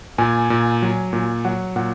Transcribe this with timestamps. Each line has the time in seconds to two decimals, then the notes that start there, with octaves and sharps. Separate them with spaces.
0.18 A#2 G#5
0.50 A#2
0.82 F#3
1.13 A#2
1.45 F#3 F#5
1.76 A#2 F#5